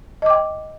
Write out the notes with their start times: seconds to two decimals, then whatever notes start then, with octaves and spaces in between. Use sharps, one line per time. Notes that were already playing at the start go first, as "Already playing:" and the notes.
0.22 D#5
0.26 D6
0.30 G5